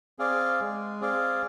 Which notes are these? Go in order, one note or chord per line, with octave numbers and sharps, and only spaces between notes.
C4 G#4 D5 F5
G#3
C4 G#4 D5 F5